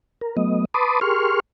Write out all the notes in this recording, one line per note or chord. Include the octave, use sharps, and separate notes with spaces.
A#4
F#3 A3 B3 D#5
B4 A5 B5 C6 D6 D#6
G4 G#4 A#4 C6 C#6 F6